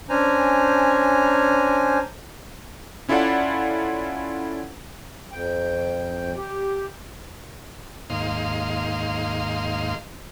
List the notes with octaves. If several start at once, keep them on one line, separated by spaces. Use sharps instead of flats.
C#4 D4 C5 G#5 A#5
C#4 E4 F4 A4 D5 F#5
F2 G5
G4
D#2 G#2 A#3 D#5 F5 C6